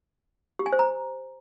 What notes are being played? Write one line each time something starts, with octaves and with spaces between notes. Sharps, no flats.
G4
G#5
C5
A#5